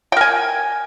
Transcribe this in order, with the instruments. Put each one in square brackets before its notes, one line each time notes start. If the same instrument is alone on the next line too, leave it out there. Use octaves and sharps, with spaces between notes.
[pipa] G5
A#4
G#5